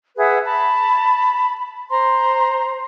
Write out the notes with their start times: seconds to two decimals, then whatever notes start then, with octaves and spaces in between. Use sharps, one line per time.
0.18 G#4 B4 E5 F#5
0.44 A5 B5
1.91 C5 A#5 C6